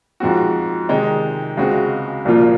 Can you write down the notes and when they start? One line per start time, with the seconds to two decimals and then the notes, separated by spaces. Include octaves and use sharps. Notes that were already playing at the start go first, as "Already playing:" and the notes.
0.20 G#2 F3 C4 F#4
0.89 C3 D#3 G#3 D#4
1.57 C#2 C#3 G#3 C4 F#4
2.25 C2 A#2 F3 A#3 F4